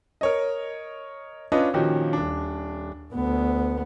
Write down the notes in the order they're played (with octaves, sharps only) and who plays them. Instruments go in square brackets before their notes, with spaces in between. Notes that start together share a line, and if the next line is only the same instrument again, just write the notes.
[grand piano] A#4 C#5 D#5
C#4 D4 F4 B4 D#5
A#2 D#3 F3 C#4 F#4 G4
D#1 D4
[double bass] D2 B3